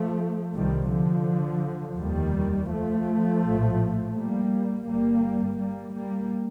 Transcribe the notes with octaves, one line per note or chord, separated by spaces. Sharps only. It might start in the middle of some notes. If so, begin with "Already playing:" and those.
Already playing: F3 A3
C2 C3 D#3 G3
D3 F3
F1 D#2 D#3 G3
F3 A3
A#1 A2
G3 A#3
G1 G2 G3 A#3
G3 A#3
G3 A#3